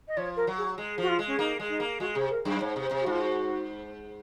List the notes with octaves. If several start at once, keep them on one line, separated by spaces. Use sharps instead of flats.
D#5
F3 C#5
A#4
F#3
G#4
G#3
F3 F#4
F4
G#3
C#4
A#3 D#4
G#3
D#4
A#3
G#3 F#4
C3 G#4
A#4
F#2 G#4
G#2 C#5
C3
C5
C3
F#4
G#2 F4
F#4